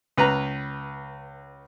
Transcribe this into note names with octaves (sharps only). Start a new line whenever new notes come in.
C#2 B4 A#5